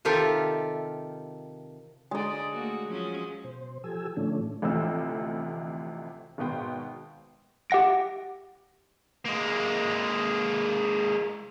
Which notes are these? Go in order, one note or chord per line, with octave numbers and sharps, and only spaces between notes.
C3 D#3 F4 G4 A4 E5
D3 G#3 D5 D#5
A3 A#3 F#4
F3 F#3 C#4
B2 C5
F3 G4 A4 G#5 E6
A2 D3 F3 A3 C#4 D4
A1 D2 C3 F3 E6
G#1 B2 B3 G5 C6
G4 E5 F#5 A#6 D7
G#3 A#3